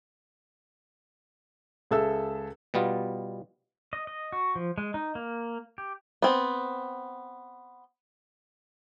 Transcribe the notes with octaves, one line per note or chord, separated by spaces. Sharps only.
C#2 G#4 A4 E5 E6
B2 G3 B3 F4
D#5
D#5
F#4
F3
G#3
D#4
A#3
G4
B3 C4